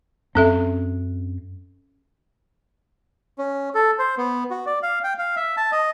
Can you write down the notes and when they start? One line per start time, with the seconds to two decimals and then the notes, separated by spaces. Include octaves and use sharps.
0.35 F#2 C4 C#4 A4 E5
3.38 C#4
3.74 A4
3.99 C5
4.17 B3
4.51 F#4
4.66 D5
4.83 F5
5.04 G5
5.18 F5
5.36 E5
5.57 A5
5.72 D#5